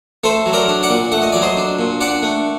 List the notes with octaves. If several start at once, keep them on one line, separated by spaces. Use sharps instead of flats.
A3 A4 C5
F#3
A#4 D5
D4
D5 F#5
A#2
A3 F#5
D#5
F#3 D5
C5 D#5
D4
A#2
D4 D5 F#5
A3